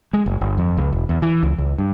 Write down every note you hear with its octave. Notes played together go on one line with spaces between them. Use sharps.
G#3
F#1
G1
F2
C#2
E1
E2
E3
C#2
C#2
G2